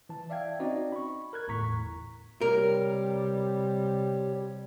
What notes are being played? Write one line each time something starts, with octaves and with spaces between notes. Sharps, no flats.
E3 A5
D5 E5 F5 G5 G#6
C4 C#4 D#4 F#4 D5 D#5
B5 C#6
A#4 F#6 G#6
G1 E2 A2 A#5 C#6 B6
C3 G3 G4 A#4 C#5